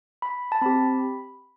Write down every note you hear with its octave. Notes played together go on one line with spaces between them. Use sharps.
B5
A5
C4 G4 B5